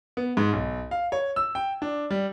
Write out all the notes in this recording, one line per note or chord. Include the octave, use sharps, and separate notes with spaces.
B3
G#2
B1
F5
C#5
E6
G5
D4
G3